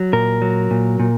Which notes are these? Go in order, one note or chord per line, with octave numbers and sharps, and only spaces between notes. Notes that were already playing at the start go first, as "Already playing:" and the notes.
Already playing: F#3
A#2 A#4
F#3
A#2
A#2